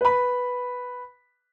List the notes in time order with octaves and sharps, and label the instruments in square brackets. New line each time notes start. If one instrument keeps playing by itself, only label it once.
[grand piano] B4 B5